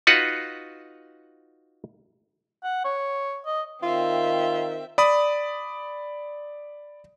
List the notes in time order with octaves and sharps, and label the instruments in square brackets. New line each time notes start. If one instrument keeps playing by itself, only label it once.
[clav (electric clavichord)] D#4 F4 F#4 B4 F#5
[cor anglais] F#5
C#5
D#5
[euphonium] D#3 [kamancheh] C4 E5 [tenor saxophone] F4
[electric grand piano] D5 B5 D#6